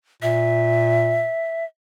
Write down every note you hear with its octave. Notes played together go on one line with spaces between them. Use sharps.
A#2 E5